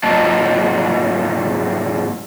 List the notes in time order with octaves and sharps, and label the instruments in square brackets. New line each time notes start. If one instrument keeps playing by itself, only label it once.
[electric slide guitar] G#2 F#3 A#3 F4 D#5 A5